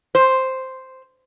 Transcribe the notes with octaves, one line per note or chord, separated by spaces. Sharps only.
C5